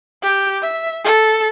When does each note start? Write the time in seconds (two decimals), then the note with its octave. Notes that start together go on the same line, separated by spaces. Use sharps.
0.23 G4
0.63 E5
1.04 A4